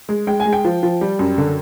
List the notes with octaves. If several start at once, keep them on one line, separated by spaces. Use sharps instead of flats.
G#3
G#3 G5
G#5
G#3
G5
F3
F3
G3
F#2
D3